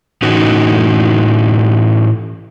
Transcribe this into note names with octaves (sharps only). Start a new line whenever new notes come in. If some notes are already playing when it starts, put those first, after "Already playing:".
A2 E3 C#4 D#4 F#4